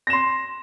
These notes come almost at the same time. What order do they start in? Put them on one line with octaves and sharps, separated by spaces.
A#6 E7 C6